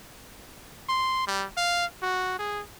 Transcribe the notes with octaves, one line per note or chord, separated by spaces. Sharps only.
C6
G3
F5
F#4
G#4